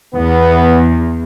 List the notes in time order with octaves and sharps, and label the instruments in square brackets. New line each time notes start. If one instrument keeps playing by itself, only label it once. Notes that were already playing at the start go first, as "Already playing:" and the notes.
[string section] E2 [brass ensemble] B3